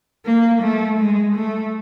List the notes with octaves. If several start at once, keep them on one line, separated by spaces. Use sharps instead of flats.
A#3
A3
G#3
A3